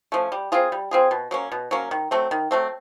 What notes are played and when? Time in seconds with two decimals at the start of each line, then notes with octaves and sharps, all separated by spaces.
0.12 F3 A3 C#4
0.32 G3
0.52 C4 F4 G#4
0.72 G3
0.91 C4 F4 G#4
1.11 B2
1.31 F#3 A#3 C#4
1.52 B2
1.71 F#3 A#3 C#4
1.91 D#3
2.11 F#3 A3 C4
2.31 D#3
2.51 F#3 A3 C4